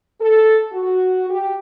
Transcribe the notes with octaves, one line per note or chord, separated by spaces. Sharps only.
A4
F#4
G4